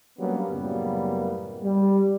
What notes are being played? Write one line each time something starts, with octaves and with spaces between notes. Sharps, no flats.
F#3 G3 A#3 B3 C#4 D4
F#2 A2 C#3 G3 A#3 B3
G3